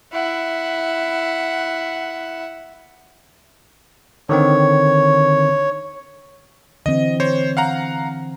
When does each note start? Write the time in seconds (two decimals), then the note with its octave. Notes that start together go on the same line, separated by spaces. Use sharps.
0.13 E4 F#5
4.29 D3 D#3 C4 C#5
6.86 D3 E3 C4 D#5
7.20 C5 C#5
7.57 F5 F#5 A#5